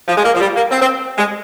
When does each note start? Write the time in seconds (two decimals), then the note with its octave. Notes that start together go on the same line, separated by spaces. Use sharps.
0.08 F3
0.17 G#3
0.25 A#3
0.35 F3
0.40 G3
0.56 A#3
0.71 C4
0.81 C4
1.18 G#3